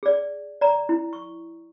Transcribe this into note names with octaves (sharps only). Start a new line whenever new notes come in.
G#4 D5
D5 A#5
E4
C#6